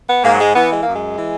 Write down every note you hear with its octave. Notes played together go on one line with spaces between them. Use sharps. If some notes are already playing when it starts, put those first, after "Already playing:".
B3
G#2 A#3
F#3
G#3
E3 B3
G#3
A#3
F#2
G#3
E3